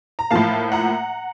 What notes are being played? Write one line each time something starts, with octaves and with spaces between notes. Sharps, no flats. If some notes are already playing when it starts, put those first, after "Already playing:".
A#5
A2 F3 A#3 F5 A5
F#5 A#5